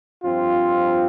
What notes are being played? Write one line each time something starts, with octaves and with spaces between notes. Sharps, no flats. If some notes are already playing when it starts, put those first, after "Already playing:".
G2 F3 C4 F4